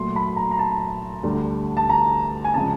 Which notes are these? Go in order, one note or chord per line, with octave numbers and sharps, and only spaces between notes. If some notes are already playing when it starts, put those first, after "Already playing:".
Already playing: A#2 F#3 A3 C6
B5
A#5
A#5
A5
D2 D3 G3
A5
A#5
G#5
C#3 F3 G#3 A5